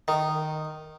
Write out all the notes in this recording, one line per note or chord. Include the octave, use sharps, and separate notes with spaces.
D#3